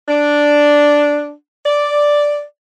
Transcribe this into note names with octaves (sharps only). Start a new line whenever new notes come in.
D4
D5